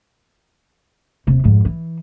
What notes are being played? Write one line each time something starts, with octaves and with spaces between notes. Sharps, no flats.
D#1 C3
F2 G#2
E3